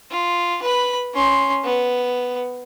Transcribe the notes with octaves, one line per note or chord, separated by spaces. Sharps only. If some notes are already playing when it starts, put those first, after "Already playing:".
F4
B4 B5
C#4 C6
B3